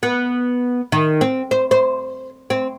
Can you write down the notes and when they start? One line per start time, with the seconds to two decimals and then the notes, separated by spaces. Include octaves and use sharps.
0.03 B3
0.92 D#3
1.21 C4
1.51 C5
1.71 C5
2.50 C4